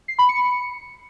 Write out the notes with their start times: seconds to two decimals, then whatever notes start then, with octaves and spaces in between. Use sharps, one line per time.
0.08 C7
0.19 B5
0.29 C#7